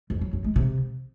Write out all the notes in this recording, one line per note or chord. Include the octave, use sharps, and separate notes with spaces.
F2
F#3
F#2
G#3
C3